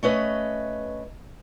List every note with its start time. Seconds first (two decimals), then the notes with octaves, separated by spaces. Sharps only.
0.03 A3 C#4 B4 D#5